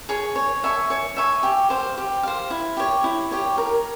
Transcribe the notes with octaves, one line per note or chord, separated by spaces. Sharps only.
G#4 C#5
C#5
E5 G#5 C#6
C#5
E5 G#5 C#6
G4
C5 F5
G4
C5 F5
E4
G4 C#5
E4
G4 C#5
A#4